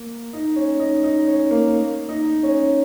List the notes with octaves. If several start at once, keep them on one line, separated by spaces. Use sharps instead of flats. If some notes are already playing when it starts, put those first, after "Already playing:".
Already playing: A#3
D#4
C#4
D#4
D#4
C#4
A#3
D#4
C#4